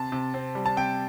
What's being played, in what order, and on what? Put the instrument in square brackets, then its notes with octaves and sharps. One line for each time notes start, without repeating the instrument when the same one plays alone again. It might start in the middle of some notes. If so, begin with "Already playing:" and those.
Already playing: [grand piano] C3 A5
C3
C4
G3
A5
C3 G5